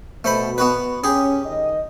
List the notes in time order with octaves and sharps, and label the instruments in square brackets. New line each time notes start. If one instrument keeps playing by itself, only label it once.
[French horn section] B2 [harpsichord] A3 C5 B5
[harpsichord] B3 F#4 B4
[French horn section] C#4 [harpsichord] G4 G#4
[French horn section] D#3 D#5